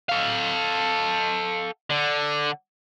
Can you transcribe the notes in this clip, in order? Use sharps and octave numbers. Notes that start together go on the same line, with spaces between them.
A4 F5
D3